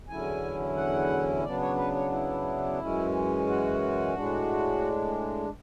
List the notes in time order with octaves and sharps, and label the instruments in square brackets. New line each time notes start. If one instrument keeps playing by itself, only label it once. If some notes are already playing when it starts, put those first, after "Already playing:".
[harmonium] E2 D3 F#3 C#4 E4 G#5
F#5
C#3 F#3 B3 D4 D5
C#5
B4
C#5
E4
F#2 E3 G#3 C#4
F#4
A2 G#3 D4